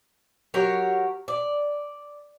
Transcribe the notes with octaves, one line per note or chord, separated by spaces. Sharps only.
F#3 G4 A#4 C#5
D5